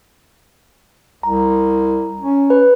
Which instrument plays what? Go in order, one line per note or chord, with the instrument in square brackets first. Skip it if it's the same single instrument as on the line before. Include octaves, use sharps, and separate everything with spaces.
[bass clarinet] C2 [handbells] A#5
[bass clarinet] C#4
[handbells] B4